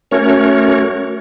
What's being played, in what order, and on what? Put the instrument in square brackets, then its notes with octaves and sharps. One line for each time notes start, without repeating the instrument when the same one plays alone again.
[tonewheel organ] A3 C#4 F#4 A#4 C#5